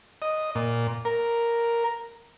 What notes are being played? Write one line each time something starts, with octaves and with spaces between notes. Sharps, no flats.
D#5
A#2
A#4